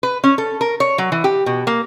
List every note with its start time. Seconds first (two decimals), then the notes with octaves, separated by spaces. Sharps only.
0.03 B4
0.24 C#4
0.38 A4
0.61 A#4
0.80 C#5
0.98 F#3
1.12 E3
1.24 G4
1.46 B2
1.67 A#3